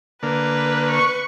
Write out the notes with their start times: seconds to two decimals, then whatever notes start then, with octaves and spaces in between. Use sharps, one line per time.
0.23 D3 A#3 B4
0.92 C#6